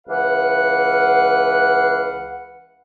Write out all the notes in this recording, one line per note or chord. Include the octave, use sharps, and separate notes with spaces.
C#2 E3 B4 F5 F#5